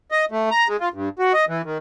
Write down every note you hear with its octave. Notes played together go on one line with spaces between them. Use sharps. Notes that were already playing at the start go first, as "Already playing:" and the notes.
D#5
A3
A#5
G#3
F4
G2
F#4
D#5
E3
D#3